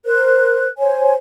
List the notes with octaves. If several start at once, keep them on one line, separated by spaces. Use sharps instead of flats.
A#4 C5 F#6
C5 C#5 G#5